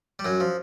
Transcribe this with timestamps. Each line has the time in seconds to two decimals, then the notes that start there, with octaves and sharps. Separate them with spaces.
0.19 G3
0.25 F#2 F#3
0.40 F3